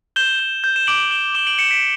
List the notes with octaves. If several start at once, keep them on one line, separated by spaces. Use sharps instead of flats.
G6 E7 G7
G6
G6
E7
D6 D7 F#7
G6 E7 G7
D6 E7 G7
D7 F#7
G6 C#7 E7
B6 D7